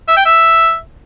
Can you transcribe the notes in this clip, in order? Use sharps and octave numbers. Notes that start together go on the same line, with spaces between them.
E5
G5
E5